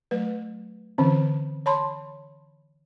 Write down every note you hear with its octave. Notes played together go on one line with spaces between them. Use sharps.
F#3 A3 B4
D3 E3 C4 C#4
C#5 A5 B5 C6